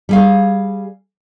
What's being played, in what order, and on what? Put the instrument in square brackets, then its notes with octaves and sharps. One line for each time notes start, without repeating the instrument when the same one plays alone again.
[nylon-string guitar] G3 G#4 F5